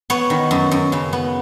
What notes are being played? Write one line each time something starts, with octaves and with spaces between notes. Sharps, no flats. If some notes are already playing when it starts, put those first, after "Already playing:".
B3 C#5
D#3
F#2
F#2
C#3
B3